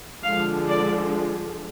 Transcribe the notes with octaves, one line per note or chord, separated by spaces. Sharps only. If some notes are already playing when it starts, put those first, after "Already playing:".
D3 F3 G#3 D4 F5
D5